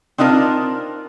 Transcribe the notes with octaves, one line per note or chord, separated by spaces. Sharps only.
C4 D4 D#4 F4 A#4